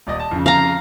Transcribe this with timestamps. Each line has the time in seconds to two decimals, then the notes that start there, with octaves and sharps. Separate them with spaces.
0.07 D#1 D5 D#5
0.19 A5
0.31 F2 C#3
0.46 F5 A#5